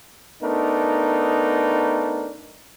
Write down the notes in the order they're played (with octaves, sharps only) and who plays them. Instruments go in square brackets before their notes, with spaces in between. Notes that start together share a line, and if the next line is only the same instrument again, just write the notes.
[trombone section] A3 B3 D4 D#4 A#4